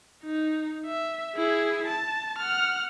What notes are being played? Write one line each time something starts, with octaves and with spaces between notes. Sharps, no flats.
D#4
E5
E4 G#4
A5
F#5 F6